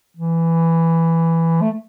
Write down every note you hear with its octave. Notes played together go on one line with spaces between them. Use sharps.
E3
A3